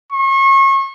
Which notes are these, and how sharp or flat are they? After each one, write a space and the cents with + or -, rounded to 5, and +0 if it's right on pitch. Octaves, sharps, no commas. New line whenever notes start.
C#6 -35